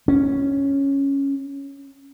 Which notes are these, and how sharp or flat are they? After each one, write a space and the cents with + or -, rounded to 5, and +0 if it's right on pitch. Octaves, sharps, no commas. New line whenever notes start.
C#4 +0